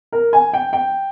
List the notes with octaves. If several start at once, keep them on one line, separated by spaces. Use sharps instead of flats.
A#4
G#5
G5
G5